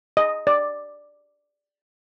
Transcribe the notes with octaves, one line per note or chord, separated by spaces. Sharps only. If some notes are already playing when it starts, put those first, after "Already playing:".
D#5
D5